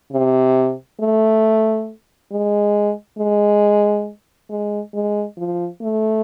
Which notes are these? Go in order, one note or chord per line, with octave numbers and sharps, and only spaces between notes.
C3
A3
G#3
G#3
G#3
G#3
F3
A3